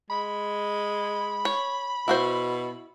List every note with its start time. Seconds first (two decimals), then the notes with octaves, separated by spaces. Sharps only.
0.10 G#3 B5
1.45 C#5
2.08 B2 E4 F#4 C5